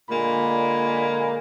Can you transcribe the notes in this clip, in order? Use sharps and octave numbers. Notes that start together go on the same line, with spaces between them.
A#2 D3 G#3 A#3 G#5 B5